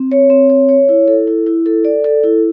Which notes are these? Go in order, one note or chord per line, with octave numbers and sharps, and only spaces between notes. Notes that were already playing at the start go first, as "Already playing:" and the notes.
Already playing: C4
C#5
C4
C#5
C#5
E4
A4
E4
E4
A4
D5
A4
E4